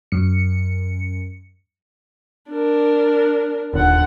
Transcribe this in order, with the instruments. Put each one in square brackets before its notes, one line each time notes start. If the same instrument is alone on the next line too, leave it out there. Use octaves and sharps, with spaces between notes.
[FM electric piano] F#2 C#7
[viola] D4 A#4
[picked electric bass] D#1 [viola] D3 F#5